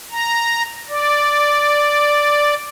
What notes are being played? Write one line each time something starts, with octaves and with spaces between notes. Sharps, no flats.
A#5
D5